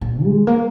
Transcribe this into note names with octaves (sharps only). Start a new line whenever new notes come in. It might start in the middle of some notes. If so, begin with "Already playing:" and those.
A#2
G#3
A#3